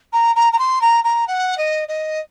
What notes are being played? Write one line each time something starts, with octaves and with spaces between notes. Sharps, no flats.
A#5
A#5
A#5
C6
A#5
A#5
F#5
D#5
D#5